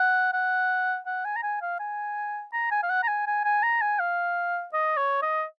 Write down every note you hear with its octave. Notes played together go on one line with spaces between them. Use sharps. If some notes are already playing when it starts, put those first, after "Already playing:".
Already playing: F#5
F#5
F#5
G#5
A#5
G#5
F5
G#5
A#5
G#5
F5
F#5
A#5
G#5
G#5
G#5
A#5
G#5
F5
D#5
C#5
D#5